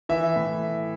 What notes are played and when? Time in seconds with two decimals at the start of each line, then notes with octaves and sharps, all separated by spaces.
0.09 E3 E5
0.36 A2